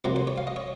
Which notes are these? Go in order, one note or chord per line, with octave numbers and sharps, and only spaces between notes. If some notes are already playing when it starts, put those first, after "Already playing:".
F2 C3 F#3 A#3 C5
C5
C#5
F5
D#5
C#5